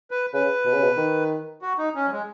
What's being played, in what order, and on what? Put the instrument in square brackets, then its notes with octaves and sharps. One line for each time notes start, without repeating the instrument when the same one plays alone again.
[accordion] B4
[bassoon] C#3 [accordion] B4
[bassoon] B2
C#3
B2
D#3
[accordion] F#4
D#4
C#4
F#3
G#3